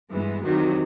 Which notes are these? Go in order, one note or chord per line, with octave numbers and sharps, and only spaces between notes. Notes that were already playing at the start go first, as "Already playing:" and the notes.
G2 E3 G#3 B3
E2 C3 D#3 F#3